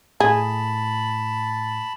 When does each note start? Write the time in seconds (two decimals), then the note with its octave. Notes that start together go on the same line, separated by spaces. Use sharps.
0.20 A2 G#4 A5 B5